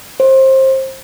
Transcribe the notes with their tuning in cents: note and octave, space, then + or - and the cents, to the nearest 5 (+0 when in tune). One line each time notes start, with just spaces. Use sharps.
C5 +25